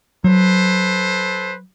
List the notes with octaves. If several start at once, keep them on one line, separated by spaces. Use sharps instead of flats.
F#3 A4 B4 C5